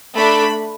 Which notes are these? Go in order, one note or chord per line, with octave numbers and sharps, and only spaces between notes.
A3 D4 A4 B5